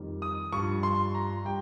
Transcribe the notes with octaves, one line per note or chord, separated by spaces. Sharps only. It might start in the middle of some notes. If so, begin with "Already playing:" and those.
Already playing: F2 D#3 G3
D#6
G2 F3 C#6
C6
A#5
G3 G5